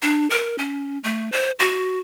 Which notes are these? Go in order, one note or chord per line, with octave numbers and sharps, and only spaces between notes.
D4
A#4
C#4
A3
C5
F#4